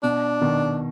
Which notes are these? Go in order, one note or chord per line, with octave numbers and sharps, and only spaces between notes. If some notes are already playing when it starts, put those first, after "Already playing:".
B2 D4
B2 D#3